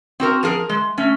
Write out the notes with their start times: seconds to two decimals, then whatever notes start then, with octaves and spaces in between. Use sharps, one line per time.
0.20 C4 F#4 A#4
0.43 F3 G#4 A#4
0.69 G#3
0.98 A3 C#4